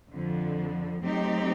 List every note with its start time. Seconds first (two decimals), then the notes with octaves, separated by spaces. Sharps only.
0.13 F2 D3 F3
1.04 F#3 A3 C4 D#4 G4